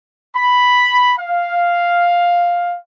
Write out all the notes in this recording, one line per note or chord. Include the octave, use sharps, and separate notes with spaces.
B5
F5